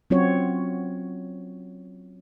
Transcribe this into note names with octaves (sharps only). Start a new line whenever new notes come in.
F#3 C4 C#4 F4 F#4 C#5